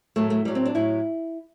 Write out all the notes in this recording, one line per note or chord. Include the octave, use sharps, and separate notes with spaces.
A2 F#3 A3
A3
A2 F#3 G3
C4
D4
A2 F#3 E4